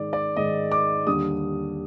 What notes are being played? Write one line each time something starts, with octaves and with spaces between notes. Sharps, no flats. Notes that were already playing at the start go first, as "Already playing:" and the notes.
Already playing: G#2 D#3 G#3 D5
D5
G#2 D#3 G#3 D#5
D6
D#2 D3 G3 D#6